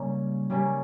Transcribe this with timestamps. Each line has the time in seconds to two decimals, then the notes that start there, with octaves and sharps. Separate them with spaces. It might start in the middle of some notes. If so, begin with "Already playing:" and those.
Already playing: C#3 G3 A#3 C#4
0.50 C#3 G3 A#3 C#4